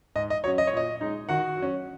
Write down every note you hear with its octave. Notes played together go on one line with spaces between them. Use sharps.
G#2 D#5
D#5
F#3 C#4 C#5
D#5
C#5
A#2 D#5
G#3 D#4
D#3 F#4 F#5
F#3
C#4